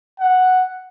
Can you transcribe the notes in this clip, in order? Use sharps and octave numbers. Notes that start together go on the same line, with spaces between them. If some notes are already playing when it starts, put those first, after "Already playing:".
F#5